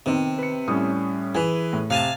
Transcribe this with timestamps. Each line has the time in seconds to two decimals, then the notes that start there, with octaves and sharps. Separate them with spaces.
0.06 C3 D#3 B3 C4
0.39 B4 C#7
0.68 A2 G3 C#4 D#6
1.35 E3 G#4 B4 G#5
1.73 A2
1.90 C3 F5 G#5 A5